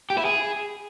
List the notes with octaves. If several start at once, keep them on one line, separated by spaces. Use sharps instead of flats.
G4
E4
G#4